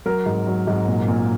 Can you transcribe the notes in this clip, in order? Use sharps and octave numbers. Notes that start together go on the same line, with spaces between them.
F#3 A#4
G#2
F#3
G#2
A#2
A#2